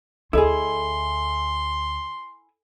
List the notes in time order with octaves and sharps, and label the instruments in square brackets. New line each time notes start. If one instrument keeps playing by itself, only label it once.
[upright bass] D2 [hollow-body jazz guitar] E4 G#4 [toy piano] A4 D#5 [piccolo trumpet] C6